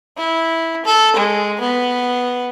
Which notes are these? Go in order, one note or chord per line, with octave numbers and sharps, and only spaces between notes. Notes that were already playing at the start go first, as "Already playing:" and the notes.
E4
A4
G#3
B3